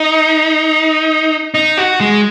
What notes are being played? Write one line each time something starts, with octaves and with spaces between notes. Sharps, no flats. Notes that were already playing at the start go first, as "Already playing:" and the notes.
Already playing: D#4
D#4
F#4
G#3